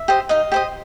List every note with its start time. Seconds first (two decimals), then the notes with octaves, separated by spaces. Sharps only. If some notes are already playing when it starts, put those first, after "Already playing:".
Already playing: E5
0.08 G4 C5 D#5
0.29 D#4 D#5 F5
0.52 G4 C5 D#5